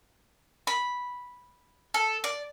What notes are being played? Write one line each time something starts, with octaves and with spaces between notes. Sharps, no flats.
B5
A4
D5